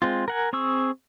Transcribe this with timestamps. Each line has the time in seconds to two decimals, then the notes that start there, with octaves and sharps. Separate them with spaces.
0.02 G#3 C4 F4
0.28 A#4 F#5 G#5
0.53 C4 G#4 C#6 E6